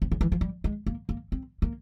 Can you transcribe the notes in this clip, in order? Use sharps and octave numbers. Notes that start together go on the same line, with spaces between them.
C3
C#3
E3
F3
G3
G#3
A#3
A#3
C4
A#3